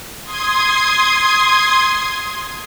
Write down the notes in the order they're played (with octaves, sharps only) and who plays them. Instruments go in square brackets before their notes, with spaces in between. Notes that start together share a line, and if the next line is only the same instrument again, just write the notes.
[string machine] C6 D#6 G#6